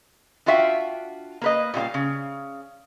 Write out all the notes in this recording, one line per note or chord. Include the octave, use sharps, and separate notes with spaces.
D4 F4 F#4 E5 F5 G5
A#3 B4 D#5
A#2 G3 F4 F5
C#3